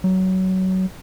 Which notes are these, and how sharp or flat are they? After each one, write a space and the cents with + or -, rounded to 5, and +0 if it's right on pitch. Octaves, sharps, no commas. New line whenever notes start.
F#3 +20